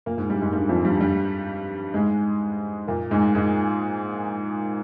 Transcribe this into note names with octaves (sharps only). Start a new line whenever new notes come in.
A#2 A#3
G#2 G#3
G2 G3
G#2 G#3
G2 G3
F2 F3
G2 G3
G2 G3
G#2 G#3
A#2 A#3
G#2 G#3
G#2 G#3